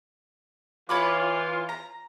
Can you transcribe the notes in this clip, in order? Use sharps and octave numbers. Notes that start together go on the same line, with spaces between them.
E3 F4 C#5 B5 D6
A#5